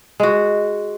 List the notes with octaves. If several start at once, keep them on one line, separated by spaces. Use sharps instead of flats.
G#3 F#4